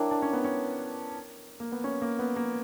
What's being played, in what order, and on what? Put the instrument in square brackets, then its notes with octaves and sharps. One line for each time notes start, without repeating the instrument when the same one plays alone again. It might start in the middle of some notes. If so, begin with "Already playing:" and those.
Already playing: [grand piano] D4 E4 [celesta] A#4 C#5 G5 A#5 D6
[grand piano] D4
C#4
B3
C#4
A#3
B3
C#4
A#3
B3
A#3